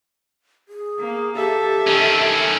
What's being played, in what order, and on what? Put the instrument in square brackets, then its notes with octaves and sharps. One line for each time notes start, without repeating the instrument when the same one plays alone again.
[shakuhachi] G#4
[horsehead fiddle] A#3
[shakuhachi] G4 [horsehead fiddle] A4 E5
[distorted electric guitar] D#3 C#4